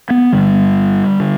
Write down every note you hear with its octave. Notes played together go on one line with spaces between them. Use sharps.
B3
G1 G2 D3 G3
D3